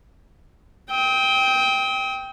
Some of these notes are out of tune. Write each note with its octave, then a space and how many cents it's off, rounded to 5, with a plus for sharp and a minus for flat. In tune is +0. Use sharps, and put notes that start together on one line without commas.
G5 +0 D#6 +45